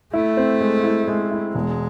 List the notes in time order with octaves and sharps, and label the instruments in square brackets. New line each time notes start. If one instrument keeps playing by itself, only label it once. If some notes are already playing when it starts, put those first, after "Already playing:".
[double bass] A3 [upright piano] E4
[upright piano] C4
G#3
E4
G#3
E4
[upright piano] E1 [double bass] G#3